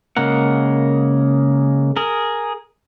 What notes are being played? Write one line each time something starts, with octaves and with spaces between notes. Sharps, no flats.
C#3 G#3 A#3 A#4 F#5
G#4 A#4